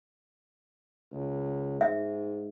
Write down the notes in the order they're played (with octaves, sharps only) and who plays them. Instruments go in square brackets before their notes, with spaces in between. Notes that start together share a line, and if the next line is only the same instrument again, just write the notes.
[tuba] C#2
[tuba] G#2 [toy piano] E5